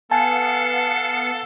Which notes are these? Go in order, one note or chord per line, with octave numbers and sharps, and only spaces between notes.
B3 A4 F5 F#5 G#5 A5